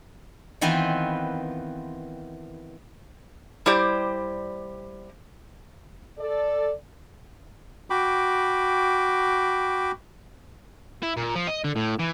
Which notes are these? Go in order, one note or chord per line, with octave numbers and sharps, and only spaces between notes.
D#3 E3 B3 C4 F4 B4
G3 E4 G4 C5 D5
A4 D5
F#4 G5 B5 D6
E4
A#2
F3
D#5
D3
A2
E3